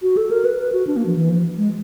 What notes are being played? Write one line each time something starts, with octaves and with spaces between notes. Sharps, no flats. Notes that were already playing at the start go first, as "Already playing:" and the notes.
F#4
A4
A#4
B4
B4
F#4
D4
A#3
F3
E3
F3
G#3